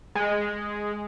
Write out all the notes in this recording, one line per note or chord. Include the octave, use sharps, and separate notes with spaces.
G#3